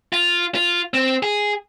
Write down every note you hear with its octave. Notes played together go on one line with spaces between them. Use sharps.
F4
F4
C4
G#4